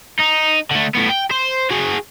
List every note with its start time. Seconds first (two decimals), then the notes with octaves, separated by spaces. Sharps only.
0.19 D#4
0.71 D3 A3
0.95 A2 B3
1.09 G5
1.31 C5
1.70 F#4 G#4